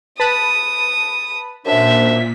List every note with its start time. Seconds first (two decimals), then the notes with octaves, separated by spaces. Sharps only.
0.20 B4 A5 B5 D#6
1.66 F#2 A#2 D4 C5 E5 B6